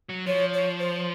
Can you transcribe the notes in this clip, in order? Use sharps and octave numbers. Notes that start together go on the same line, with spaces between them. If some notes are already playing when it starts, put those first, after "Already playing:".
F#3
F3 C#5
C#5
C5